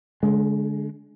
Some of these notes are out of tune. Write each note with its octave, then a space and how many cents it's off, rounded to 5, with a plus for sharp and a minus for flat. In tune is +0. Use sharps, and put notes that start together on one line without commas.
D3 -20 G#3 +20